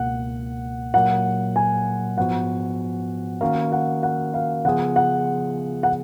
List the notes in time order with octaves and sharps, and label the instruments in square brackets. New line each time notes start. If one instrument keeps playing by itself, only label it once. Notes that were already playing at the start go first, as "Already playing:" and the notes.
Already playing: [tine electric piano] C#2 B2 A#3 [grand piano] F#5
[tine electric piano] A#2 F#3 A#3 [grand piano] F#5
[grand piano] G#5
[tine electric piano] G#2 F3 B3 F#4 [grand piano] F#5
[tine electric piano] D#3 A#3 C#4 F#4 A#4 [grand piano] F5
[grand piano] F#5
F#5
F5
[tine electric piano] C#3 F3 B3 F4 G#4 [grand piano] F#5
[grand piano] F#5
F#5